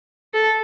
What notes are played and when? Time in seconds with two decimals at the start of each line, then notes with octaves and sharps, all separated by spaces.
0.34 A4